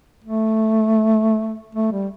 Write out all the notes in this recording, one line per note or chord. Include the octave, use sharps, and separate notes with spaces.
A3
A3
G3